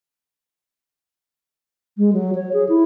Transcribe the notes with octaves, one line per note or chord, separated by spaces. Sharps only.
G#3
F#3
C#5
G#4
E4